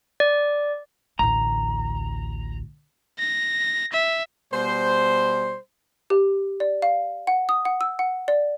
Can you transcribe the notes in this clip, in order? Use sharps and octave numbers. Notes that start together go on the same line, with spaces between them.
D5
A1 D2 A#5
A#6
E5
B2 G3 C5
G4
D5
F5
F#5
D#6
F#5
E6
F#5
D5